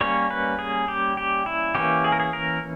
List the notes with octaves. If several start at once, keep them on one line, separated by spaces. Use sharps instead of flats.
G3 A#3 C#4 C#5
B4
G#4
G4
G4
E4
E3 A#3 C#4 G4
G#4
A#4
G#4
A#4